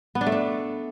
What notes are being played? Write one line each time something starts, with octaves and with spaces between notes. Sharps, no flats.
B3
D4
A3
D4